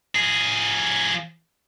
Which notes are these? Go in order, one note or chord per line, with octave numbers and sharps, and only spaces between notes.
F3 G#4